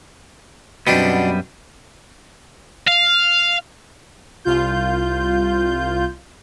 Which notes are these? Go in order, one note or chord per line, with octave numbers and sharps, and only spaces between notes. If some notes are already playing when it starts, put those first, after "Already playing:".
F#2 B2 G3 B3 C4 D4
F5
C2 F4 G6